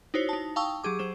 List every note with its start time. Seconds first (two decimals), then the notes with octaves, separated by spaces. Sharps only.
0.14 D#4 E4 F#4 C5 C#5
0.29 D#4 A5
0.56 F5 G5 A5 C#6 D#6 E6
0.84 F#3 G4 G#4 D6
0.99 F#3 C5 E7